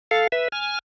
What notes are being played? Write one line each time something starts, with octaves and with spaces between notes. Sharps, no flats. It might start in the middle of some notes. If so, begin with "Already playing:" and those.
A4 F5
B4 E5
G#5 F6